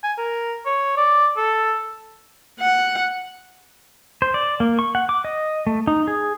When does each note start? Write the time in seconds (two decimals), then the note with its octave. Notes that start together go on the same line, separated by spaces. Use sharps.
0.03 G#5
0.18 A#4
0.65 C#5
0.97 D5
1.37 A4
2.60 F#5
4.22 C5
4.34 D5
4.60 A#3
4.79 C#6
4.95 F#5
5.09 D6
5.24 D#5
5.67 A3
5.87 D#4
6.08 G#4